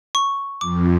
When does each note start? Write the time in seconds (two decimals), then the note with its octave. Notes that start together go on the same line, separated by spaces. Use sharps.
0.15 C#6
0.61 F2 D6